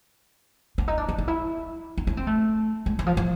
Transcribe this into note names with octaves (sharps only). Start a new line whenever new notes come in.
D4
D#4
D4
D4
D#4
E4
D#4
D4
C4
A3
G#3
E3
F3
F3